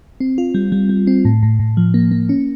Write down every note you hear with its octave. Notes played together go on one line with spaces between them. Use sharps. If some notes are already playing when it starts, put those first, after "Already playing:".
C4
F4
G3
G3
G3
C4
A2
A2
A2
F3
A#3
A#3
C#4